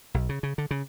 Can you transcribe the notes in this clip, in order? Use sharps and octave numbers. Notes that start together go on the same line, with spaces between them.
B1
C#3
C#3
D3
C#3